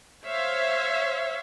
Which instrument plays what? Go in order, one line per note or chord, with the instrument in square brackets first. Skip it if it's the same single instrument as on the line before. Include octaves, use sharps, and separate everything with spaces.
[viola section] C5 C#5 E5 F5